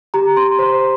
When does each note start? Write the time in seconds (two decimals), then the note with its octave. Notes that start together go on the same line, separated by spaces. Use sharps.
0.14 G4 A#5
0.37 C6
0.59 C5 C6